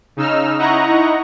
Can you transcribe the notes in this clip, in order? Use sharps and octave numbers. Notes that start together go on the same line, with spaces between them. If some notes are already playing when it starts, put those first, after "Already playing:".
C#3 D#4 E6 F6
D#4 E4 D#5 F#5 A#5 C#6